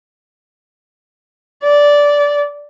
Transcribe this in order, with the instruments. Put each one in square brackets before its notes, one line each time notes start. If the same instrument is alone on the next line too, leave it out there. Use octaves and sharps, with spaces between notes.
[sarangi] D5